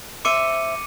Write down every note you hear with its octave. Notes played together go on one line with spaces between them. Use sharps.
C5 E5 D6 C#7 D#7